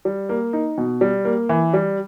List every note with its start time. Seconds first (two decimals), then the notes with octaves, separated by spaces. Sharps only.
0.05 G3
0.29 A#3
0.53 D#4
0.78 B2
1.01 G3
1.25 A#3
1.49 E3
1.74 G3